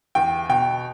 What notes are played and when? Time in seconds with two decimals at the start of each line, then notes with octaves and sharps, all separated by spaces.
0.15 E2 G5
0.49 B2 G5